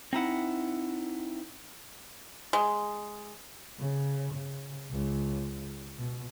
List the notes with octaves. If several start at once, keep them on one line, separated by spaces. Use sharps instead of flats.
C4 D#4 E4 F#5
G#3
C#3
C#3
C#2
B2